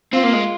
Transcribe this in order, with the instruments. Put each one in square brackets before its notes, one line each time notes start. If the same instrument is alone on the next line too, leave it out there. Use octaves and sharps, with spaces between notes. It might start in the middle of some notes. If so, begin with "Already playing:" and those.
[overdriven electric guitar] C4 [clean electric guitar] F4
[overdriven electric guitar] A#3
G#3